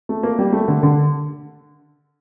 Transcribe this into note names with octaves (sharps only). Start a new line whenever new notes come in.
A3
A#3
G3
A3
D3
D3